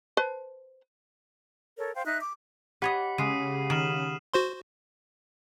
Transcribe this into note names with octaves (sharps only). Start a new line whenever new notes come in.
B4 C5 A5
A4 A#4 C#5
C5 F5 G5
D#4 E5 F#6
D6
G4 B4 C#5 D#5 F#5 B5 B6
C#3 G#3 D#6 C7 D#7
D#3 F6 E7 F#7
F#4 C5 C6